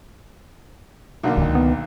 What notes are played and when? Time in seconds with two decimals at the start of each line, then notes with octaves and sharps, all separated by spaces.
1.23 B1 D3 A#3
1.37 D1 C#2 D#3
1.55 B3